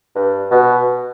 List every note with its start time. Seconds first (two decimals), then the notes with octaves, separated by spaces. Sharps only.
0.15 G2
0.51 B2